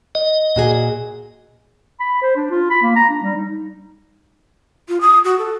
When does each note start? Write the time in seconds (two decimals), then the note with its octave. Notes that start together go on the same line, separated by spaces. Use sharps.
0.15 D#5
0.56 A#2 F#4 G#4
2.00 B5
2.22 C5
2.36 D4
2.50 F4
2.70 B5
2.82 A#3
2.96 A#5
3.09 D4
3.23 G3
3.36 D#4
4.89 F4
5.01 D#6
5.24 F#4
5.38 A4